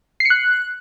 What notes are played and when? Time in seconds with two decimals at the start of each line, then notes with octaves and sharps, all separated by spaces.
0.20 C7
0.25 C#7
0.30 F#6